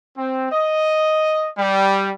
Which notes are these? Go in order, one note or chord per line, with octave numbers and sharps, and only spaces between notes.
C4
D#5
G3